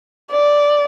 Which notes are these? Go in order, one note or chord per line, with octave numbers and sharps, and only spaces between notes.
D5